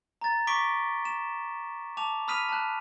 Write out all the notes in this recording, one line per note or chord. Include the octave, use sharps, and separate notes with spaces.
A#5 A6
C#6 D6 B6 D7 G7
E7
A5 D6 F7
B5 D#6 F6 B6 D#7 F7
A5 F#6